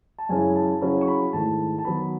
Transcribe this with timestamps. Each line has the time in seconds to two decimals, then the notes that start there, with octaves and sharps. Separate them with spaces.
0.18 A5
0.29 F#2 C#3 G#3 C#4 E4 G#5
0.56 A5
0.81 C#3 F#3 C#4 E4 B5
1.01 C#6
1.08 B5
1.33 G#2 D#3 A3 E4 A5
1.78 A5
1.85 D#3 F#3 B3 B5